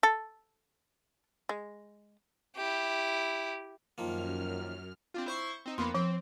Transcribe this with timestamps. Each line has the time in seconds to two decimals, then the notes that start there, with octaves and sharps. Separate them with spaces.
0.03 A4
1.49 G#3
2.56 E4 G4
3.98 F#2 D#3 F3 A#3 F6
5.14 C4 D4 F4
5.26 E4 C5 C#6
5.66 C4 D#4
5.78 F2 A#3 B3 B5 C6
5.95 F3 C4